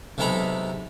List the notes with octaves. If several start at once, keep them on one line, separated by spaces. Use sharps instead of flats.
B1 C3 G#3 A4 A#5 B5